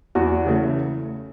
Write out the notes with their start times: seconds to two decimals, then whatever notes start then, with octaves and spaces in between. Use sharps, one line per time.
0.15 E2 F#4
0.47 C#3 E3 A3